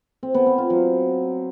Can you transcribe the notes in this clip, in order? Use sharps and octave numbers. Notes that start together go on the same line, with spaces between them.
C4
B3
C4
F4
F#3